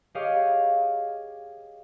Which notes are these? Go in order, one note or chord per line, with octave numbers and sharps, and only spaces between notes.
G4 G#4 C#5 D#5 F5 G5